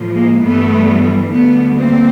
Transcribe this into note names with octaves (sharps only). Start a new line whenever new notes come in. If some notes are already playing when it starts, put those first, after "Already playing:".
Already playing: A2 F3
G#3 A#3
G2 E3 G3 A3 B3
D2 D3 G3 A3 B3
A#3 C4